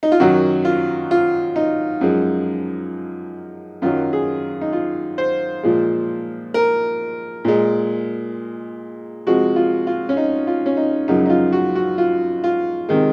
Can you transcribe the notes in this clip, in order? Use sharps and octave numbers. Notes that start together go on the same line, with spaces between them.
D#4
F4
F#2 D#3 F#3 F#4
F4
F4
D#4
F#2 F3 G#3
F#2 D#3 F#3 F4
G#4
D#4
F4
C5
A#2 F3 G#3
A#4
A#2 G#3
C3 F3 G#3 F#4
F4
F4
C#4
D#4
F4
C#4
D#4
F#2 C#3 F3 G#3 D#4
D#4
F4
F#4
F#4
F4
F4
C3 D#3 G#3